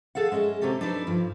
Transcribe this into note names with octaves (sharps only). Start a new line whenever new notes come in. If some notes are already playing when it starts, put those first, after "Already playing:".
G#4 A4 F5 F#5
G#3 C#4 D#5 E5
C3 C#4 G4 A4
D4 D#4 A4 B4 D5
G2 F3